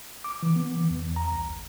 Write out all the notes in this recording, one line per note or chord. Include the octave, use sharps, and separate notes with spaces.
D6
E3
B3
E3
E2
A#5
C2
G1